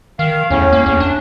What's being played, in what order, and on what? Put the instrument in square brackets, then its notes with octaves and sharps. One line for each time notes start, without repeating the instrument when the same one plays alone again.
[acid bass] D#3 [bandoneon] F5
[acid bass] E2 [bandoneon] A2 C#4
[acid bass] A#3
E2
D4